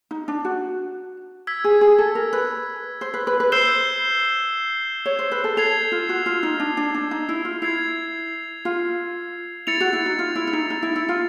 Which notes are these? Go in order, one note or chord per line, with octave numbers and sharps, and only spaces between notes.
D#4
D4
F#4
E6 G#6 B6
G#4
G#4
A4
A#4
B4
C5
B4
B4
B4
C5 E6 G6 C7 E7 G7
C#5
C5
B4
A4
A4 G#6 C7 F7
F4
F#4
F4
D#4
D4
D4
D4
D#4
E4
F4
E4 G#6 C7 F7
F4
E4 A6 C#7 F7
F#4
E4
D#4
F4
E4
E4
D#4
D#4
E4
E4
F4